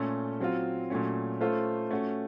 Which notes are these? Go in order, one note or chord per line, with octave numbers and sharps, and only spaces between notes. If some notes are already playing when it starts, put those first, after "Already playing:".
Already playing: A#2 A3 C#4 A4
F#3 C4 F4
A#2 F#3 A3 C#4
A3 C#4 F4 A4 C5
A3 C#4 F#4